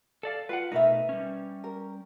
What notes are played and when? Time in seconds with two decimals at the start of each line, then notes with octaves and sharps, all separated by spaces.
0.23 A4 D5 F5
0.49 F4 B4 F5 F#5
0.72 B2 A3 D#4 A#4 B4 E5
1.09 G3 C#4
1.64 A#4